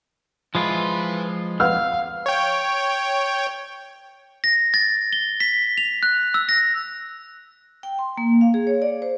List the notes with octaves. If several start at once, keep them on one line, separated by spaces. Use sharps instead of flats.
F3 G#3 E4 F4 B4
B4 F5 F#5 F6
C#5 G5
A#6
A6
G7
B6
F7
F#6
E6
A#6
G5
C6
A#3
F5
G#4
C#5
D5
C5